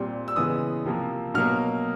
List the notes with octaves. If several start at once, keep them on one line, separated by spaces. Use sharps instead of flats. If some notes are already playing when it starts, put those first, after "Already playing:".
Already playing: A#2 G3 C4
E6
C#3 E3 G#3 B3 D#6
C3 F3 A#3
B2 F#3 A#3 F6